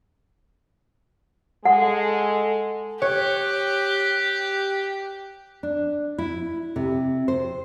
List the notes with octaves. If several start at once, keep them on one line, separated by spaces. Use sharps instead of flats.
G#3 A4 F#5
G4 C#5 F#6
D4
E4
C3
C5